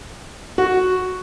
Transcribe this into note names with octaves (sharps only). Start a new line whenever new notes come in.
F#4